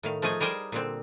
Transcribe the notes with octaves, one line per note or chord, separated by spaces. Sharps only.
A2 D#3 F5
F3 A3 D#4 G#4
G3 G#4 A#4 C5 G5
A#2 D3 C4